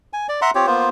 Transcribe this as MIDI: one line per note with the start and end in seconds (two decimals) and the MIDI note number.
0.13 0.27 80
0.29 0.40 74
0.42 0.51 76
0.42 0.51 78
0.42 0.51 82
0.42 0.51 84
0.55 0.66 60
0.55 0.66 65
0.55 0.66 67
0.55 0.66 73
0.67 0.89 58
0.67 0.89 59
0.67 0.89 65
0.67 0.89 72